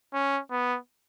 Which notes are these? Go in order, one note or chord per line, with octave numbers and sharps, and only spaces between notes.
C#4
B3